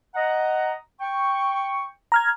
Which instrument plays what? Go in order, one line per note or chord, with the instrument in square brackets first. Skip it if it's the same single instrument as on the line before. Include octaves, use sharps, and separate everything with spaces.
[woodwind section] D#5 F#5 A#5
G5 C#6
[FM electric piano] A#5 F6 G#6